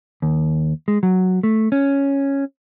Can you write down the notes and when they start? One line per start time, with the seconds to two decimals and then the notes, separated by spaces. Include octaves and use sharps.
0.22 D#2
0.88 G#3
1.03 F#3
1.43 A3
1.72 C#4